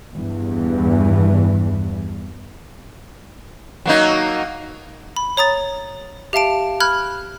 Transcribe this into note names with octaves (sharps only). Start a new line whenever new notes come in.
E2 G2 E3
F#3 A#3 D#4
B5
C#5 A#5 D#6 A6
G4 E5 F5 A5 D7
B5 F6 F#6 G#6